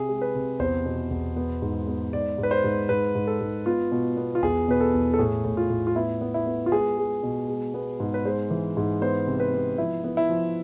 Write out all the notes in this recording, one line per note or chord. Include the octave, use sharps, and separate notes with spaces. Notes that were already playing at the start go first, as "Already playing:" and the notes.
Already playing: C3 G#4
G#3
B4
C3
E2 C5
B2
E2
B3
G#2
B3
G#2 D5
G#2
B4
C5
G#2
G#2 B4
G#2
A4
G#2
B3 F4
B2
B3
F4
E2 G#4
B2 B4
A4
E2
A4
A2 G#4
A2
F4
A2
F4
B3 E4
B3
E4
B3
F4
G#3 G#4
G#3
B2
G#3
B3
G#2
B4
G#3 C5
E3
G#2
B3 C5
C3
B4
B3
F3 E4
B3
E4
F3